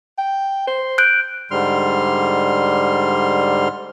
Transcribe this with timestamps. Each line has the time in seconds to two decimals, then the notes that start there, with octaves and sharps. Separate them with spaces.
0.18 G5
0.67 C5
0.98 F#6 G6 D7
1.51 G#2 D3 G3 C6 F6